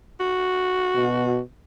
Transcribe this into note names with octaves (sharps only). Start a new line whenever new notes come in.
F#4
B2